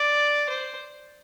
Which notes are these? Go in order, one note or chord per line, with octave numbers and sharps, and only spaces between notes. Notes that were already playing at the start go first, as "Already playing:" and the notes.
Already playing: D5
C5